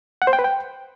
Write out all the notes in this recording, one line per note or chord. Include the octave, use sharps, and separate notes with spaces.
F#5
C5
G5
B4
G5